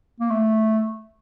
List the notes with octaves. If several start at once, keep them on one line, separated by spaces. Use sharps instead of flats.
A#3
A3